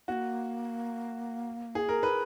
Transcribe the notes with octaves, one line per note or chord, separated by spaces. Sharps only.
A#3 B3 F#4
G#4
A#4
B4